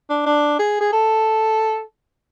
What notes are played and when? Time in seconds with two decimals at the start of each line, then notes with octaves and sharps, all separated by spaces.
0.10 D4
0.26 D4
0.59 G#4
0.81 G#4
0.93 A4